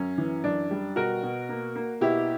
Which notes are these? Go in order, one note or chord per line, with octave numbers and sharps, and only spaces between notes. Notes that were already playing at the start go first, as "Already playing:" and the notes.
Already playing: F#2 C#4
E3
F#2 D4
G3
B2 F#4 A#4
B2
A#3
A#3
B2 E4 G4